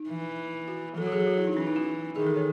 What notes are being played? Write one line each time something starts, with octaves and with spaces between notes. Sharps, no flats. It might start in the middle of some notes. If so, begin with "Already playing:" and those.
Already playing: D#4
E3
F#4
F#3 A4
F#4
G#4
F#4
E4
D#4
E3 C#4
D#4
F#4
D#3 G#4
A4
C#5